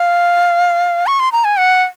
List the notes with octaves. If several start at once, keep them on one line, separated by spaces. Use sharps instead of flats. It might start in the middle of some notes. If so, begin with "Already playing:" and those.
Already playing: F5
C#6
C6
A#5
G#5
F#5